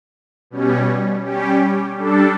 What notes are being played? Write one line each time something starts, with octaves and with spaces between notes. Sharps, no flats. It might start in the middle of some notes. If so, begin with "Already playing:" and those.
B2 G3 C#4
G3 C#4 G4
G3 D4 A4